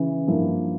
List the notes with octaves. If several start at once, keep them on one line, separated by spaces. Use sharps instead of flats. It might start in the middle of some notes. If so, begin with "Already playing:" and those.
Already playing: C#3 E3
G2 F3 A#3 E4